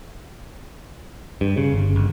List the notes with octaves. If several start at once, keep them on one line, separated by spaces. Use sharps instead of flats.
G2
C#3
G1
G1